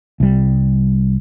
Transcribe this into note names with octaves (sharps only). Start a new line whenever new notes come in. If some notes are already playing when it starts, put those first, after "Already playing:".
C2 G3